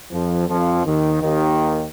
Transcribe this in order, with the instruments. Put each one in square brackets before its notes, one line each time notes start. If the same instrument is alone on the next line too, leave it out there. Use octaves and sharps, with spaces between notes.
[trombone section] F2 F3
F2 F3
D#2 D#3
D#2 D#3